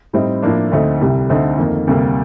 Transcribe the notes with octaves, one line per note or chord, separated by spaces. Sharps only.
A2 G3 C4 D#4
A2 F3 A#3 D4
D2 D3 A3 C4 D#4
C2 C3 G3
D2 D3 A3 C4 D#4
F2 D#3 A#3
D2 C3 G3 A#3